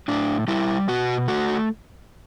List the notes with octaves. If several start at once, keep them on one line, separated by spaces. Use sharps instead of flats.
A2 D4
G3 E4
B2 F#4
A3 F#4